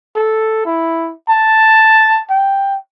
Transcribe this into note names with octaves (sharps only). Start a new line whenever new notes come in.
A4
E4
A5
G5